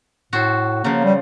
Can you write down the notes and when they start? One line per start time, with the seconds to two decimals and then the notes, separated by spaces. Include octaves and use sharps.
0.33 A2 F#4 A4 C5
0.84 C#3 F3 A#3
1.04 G3